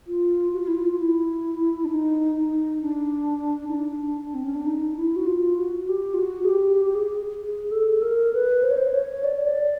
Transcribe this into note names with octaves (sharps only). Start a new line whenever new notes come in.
F4
F#4
F4
E4
F4
F4
E4
D4
D#4
D#4
D4
D#4
D4
C4
C#4
D4
D#4
E4
F#4
F4
F#4
G4
F4
F#4
G#4
G4
G4
G#4
G#4
A4
A#4
B4
C5
C#5
C5
C#5
D5
C#5
D5